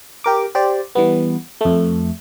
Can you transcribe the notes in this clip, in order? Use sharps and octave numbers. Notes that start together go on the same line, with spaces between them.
G4 A#4 D6
G4 C5 D5
E3 G3 B3
F2 A3